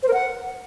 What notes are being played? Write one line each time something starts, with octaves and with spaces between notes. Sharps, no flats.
C5
A#4
F#5